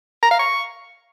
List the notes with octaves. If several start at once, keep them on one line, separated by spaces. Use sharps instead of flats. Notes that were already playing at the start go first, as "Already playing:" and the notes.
A#5
F5
C#6